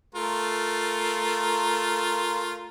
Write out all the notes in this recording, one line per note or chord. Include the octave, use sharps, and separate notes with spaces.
A3 F4 A#4